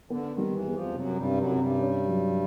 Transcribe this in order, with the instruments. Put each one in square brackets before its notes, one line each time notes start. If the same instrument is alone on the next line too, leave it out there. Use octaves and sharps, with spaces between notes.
[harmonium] D3 [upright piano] B3
[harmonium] D#3
[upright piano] G3
[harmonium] E2 E3
[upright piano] B3
[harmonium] F2 F3
[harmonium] F#2 F#3 [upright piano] C3
[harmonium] G2 G3
[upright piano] C3
[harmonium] F#2 F#3
[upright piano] C3
[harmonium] G2 G3
[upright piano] C#4
F#3